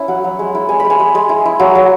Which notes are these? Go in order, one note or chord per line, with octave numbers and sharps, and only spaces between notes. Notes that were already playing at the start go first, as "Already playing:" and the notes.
Already playing: C#4 E4
F#3 F#5
F#3
G#3
E4
G#3 G#5
G#3 B5
G#5
G#3
G#3
E4
E4
F#3
F#3